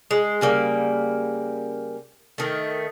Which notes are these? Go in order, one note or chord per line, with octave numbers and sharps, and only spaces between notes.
G#3
C#3 G3 A#3
D#3 A3